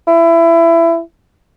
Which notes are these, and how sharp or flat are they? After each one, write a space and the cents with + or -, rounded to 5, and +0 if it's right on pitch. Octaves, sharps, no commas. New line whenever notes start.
E4 +20